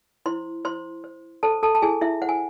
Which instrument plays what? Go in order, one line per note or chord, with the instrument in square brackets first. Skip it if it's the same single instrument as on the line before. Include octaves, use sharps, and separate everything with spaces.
[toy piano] E4 C5 C6
E4 C5 C6
C5
A4 C5 A5
A4 A5
A5
E4 G#4 G#5
E4 E5
C5 F#5
G#5